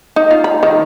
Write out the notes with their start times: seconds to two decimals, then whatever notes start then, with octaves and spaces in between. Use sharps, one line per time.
0.16 D#4
0.31 F4
0.44 B5
0.63 D#3